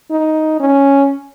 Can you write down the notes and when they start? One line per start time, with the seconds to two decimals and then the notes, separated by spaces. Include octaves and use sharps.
0.10 D#4
0.60 C#4